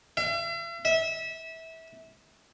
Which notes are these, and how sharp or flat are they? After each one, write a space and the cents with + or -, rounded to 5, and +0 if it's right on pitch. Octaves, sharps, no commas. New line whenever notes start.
E5 +45
E5 -25